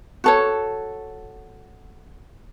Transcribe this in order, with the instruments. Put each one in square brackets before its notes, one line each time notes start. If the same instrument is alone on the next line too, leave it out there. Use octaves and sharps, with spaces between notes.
[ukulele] F#4 A4 C#5